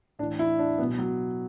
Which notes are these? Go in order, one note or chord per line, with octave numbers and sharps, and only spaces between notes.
A2 E3 D4
E4
D4
B2 F#3 B3
F#3